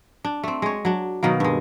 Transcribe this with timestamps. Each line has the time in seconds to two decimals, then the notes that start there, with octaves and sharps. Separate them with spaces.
0.25 D4
0.44 A3 C4
0.62 G#3 C#5
0.85 F#3 D4
1.23 B2 D#3 F#3 A#3
1.40 G2 G#3